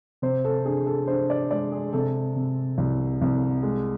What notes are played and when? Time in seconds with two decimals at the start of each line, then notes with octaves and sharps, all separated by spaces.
0.22 C3 C5
0.45 A4
0.65 D4 G#4
0.87 A4
1.07 D4 C5
1.30 D5
1.51 G#3 D5
1.72 G#4
1.93 C3 A4
2.36 C3
2.78 C2
3.22 C2
3.63 G#3